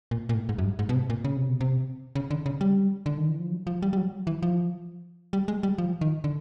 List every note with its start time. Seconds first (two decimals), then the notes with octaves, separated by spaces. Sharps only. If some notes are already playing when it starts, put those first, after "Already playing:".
0.11 A#2
0.29 A#2
0.34 A2
0.49 G#2
0.58 F#2
0.64 G2
0.79 G#2
0.89 B2
0.94 C3
1.10 A#2
1.24 C#3
1.36 C3
1.49 B2
1.61 C3
2.15 C#3
2.31 D3
2.46 C#3
2.61 G3
3.06 D3
3.18 D#3
3.29 E3
3.40 F3
3.52 F#3
3.67 F3
3.82 G3
3.93 G3
3.97 F#3
4.27 E3
4.42 F3
5.33 G3
5.48 G#3
5.63 G3
5.78 F3
6.01 D#3
6.24 D3